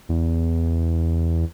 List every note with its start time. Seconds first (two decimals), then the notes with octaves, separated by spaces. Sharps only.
0.09 E2